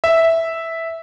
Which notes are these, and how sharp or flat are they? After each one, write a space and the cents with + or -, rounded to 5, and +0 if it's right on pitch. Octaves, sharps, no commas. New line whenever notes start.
E5 -5